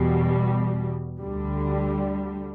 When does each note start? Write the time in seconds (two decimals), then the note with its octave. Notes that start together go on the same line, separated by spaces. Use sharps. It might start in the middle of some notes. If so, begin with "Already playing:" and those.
Already playing: E2 B2 G3
1.20 D2 D3 G3